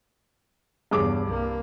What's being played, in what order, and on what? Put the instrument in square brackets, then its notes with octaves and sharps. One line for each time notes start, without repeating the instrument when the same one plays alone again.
[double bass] E2 C#3 [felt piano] G2 G#4 D6
[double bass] C2 A#3